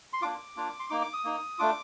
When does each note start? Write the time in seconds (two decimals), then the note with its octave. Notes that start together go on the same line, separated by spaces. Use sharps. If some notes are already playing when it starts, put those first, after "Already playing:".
0.13 C6
0.22 A#3 D4 F4 D6
0.56 A#3 D4 F4
0.80 C6
0.90 A#3 D#4 D6
1.02 D6
1.13 D#6
1.24 A#3 D#4
1.59 A3 D4 F4 D6